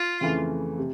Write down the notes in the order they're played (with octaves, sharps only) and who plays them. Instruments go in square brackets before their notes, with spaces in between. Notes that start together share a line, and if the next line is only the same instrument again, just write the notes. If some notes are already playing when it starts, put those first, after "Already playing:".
Already playing: [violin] F4
[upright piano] F2 C#3 E3 A3
C3